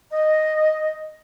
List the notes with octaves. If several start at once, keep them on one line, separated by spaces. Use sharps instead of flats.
D#5